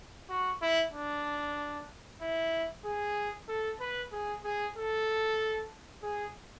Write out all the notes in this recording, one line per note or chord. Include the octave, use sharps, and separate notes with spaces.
F#4
E4
D4
E4
G#4
A4
B4
G#4
G#4
A4
G#4